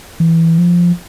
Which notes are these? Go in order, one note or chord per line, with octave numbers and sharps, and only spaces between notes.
E3
F3